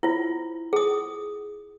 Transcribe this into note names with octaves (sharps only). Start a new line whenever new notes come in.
E4 F4
G#4 D#6